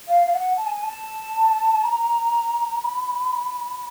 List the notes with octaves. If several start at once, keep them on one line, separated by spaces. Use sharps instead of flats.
F5
F5
F#5
A5
G#5
A5
A#5
B5